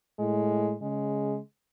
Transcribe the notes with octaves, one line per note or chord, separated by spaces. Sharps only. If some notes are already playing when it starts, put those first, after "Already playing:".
A2 G#3
C#3 G#3